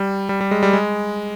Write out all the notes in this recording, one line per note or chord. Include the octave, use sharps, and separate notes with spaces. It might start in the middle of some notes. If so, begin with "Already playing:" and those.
Already playing: G3
G3
G3
G#3
G3
G#3